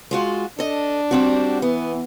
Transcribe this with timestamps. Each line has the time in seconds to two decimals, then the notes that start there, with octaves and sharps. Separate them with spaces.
0.11 G#3 F4 F#4
0.59 D4 A4 D#5
1.11 G3 C4 F#4
1.62 E3 B3